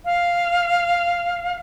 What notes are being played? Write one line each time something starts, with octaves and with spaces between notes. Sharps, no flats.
F5